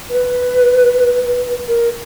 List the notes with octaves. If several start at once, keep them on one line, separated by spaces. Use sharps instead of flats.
B4
A#4